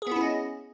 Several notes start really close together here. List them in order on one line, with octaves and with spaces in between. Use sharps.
G#4 B3 E4 C#4 D#5